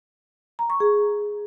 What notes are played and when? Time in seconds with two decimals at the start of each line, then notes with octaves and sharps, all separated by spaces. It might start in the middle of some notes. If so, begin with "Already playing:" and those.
0.59 A#5
0.70 C#6
0.80 G#4